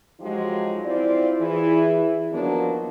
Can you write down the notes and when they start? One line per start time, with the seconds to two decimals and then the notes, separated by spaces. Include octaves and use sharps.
0.20 F3 F#3 G#3 D#4 F4 G4
0.85 C4 E4 F4 D5
1.39 E3 E4 G#4
2.31 D#3 F3 F#3 A#3 B3 D4